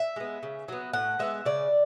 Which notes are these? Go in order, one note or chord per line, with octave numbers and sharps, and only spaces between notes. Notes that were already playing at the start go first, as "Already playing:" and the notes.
Already playing: E5
G#3 B3
C#3
F#3 B3
A2 F#5
G#3 B3 E5
C#3 D5